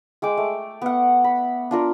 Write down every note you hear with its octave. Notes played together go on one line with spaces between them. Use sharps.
G#3 G5 D6
A3
B3 F#5
B5
D4 F4 A#4